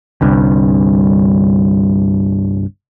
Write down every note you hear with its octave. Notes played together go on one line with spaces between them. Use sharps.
G1 C2 G2